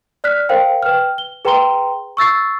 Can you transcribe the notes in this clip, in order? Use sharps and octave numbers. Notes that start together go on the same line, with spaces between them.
D5 F6 F#6 B6
A#4 C5 F5 G5
B4 G5 F6
G7
G#4 B4 G5 A#5 C6 G7
C#6 E6 A6 C7